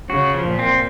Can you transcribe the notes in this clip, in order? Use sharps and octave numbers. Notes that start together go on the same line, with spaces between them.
C#3 F#4
F3
A#2
C4